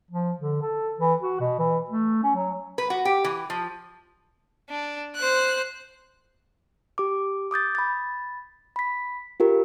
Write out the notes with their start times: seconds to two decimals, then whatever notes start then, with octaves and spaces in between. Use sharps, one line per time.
0.11 F3
0.39 D3
0.62 A4
1.00 E3
1.21 F#4
1.40 B2
1.59 E3
1.90 A3
2.23 C#4
2.35 F#3
2.78 B4
2.90 F#4
3.05 G4
3.24 E3
3.50 F3
4.70 D4
5.16 C5 F#6
6.98 G4 D6
7.51 D6 D#6 G6 A6
7.75 B5 A6
8.76 B5 B6
9.40 F4 G4 A#4